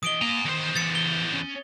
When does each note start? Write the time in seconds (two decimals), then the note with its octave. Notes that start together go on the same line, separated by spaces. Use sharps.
0.03 E3 D#5 D#6 D7 G7
0.22 A#3 G#5 A#5
0.45 E2 D#3 C5
0.75 E3 A6 C#7
0.95 G7
1.34 C#4